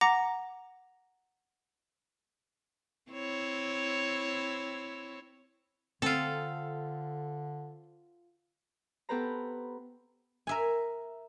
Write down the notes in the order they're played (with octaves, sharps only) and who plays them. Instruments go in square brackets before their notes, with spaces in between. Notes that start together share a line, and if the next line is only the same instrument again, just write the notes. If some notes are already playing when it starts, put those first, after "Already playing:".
[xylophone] F#5 A#5 D6 A#6
[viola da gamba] C4 E4 C#5
[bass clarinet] D3 [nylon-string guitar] C4 [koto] F4 A4
[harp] B3 G4 A4 B4 C5 A#5
[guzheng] A#4 E5 G#5